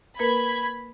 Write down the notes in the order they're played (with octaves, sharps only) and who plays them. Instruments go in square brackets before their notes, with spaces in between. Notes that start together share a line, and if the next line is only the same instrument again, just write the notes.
[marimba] A#3 A#4 B4 [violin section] B5 G#6